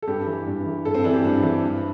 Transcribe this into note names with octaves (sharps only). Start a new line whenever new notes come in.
A4
G2 G4
E3
G2
E3
G2 A4
C4
E3 D4
G4
G2 D4
E3
G2